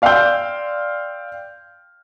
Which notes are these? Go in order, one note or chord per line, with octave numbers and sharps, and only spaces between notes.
D5 F5 G5 C6 E6 G6